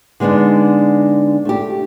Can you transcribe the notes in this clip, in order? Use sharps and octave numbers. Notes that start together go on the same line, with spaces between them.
D3 G#3 B3 D4 D#4
A3 G4